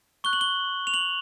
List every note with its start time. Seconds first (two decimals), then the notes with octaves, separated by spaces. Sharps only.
0.24 C#6 F#6 G7
0.33 F#7
0.41 G7
0.87 F7
0.94 F#7